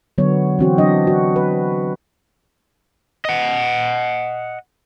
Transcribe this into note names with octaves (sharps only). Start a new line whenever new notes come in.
D3 F#3 B3 C#5
E3 C4 F#4
F#3 D4 D#5
F#4
B4
D#5 F#5